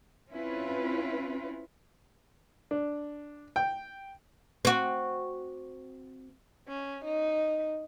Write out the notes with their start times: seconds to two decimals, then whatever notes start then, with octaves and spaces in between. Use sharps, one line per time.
0.31 C4 C#4 E4 F4 B4
2.71 D4
3.56 G5
4.65 C4 F#4
6.68 C#4
7.05 D#4